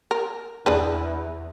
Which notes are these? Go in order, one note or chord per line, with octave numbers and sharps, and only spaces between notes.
A#4
E2 D4 G#4 B4